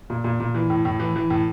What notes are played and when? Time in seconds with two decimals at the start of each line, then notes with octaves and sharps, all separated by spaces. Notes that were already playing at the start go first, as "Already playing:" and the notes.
0.10 A#2
0.24 A#2
0.40 A#2
0.54 E3
0.70 A2
0.85 A2
1.00 E3
1.16 E3
1.30 A2